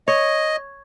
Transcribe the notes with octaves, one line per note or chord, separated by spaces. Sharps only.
C#5 D#5